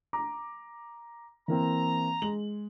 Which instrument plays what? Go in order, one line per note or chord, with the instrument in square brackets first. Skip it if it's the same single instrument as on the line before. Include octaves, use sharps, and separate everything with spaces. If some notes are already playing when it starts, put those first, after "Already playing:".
[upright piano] A#5 D6
[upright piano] E3 A#3 C4 [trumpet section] A#5
[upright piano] G#3 F#7